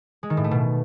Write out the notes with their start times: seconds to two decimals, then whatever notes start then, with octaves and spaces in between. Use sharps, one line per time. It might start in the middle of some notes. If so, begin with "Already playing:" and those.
0.23 G#3
0.30 D#3
0.37 A2
0.44 A3
0.51 B2